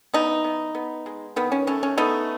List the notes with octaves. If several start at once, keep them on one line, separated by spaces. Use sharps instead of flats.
E3 B3 D#4
B3
B3
G#3
D#3 B3
C#4
A3 C#4
C#4
A3 B3 D#4